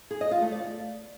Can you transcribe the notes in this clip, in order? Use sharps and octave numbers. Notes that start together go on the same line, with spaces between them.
G#4
D#5
F4
A3
D5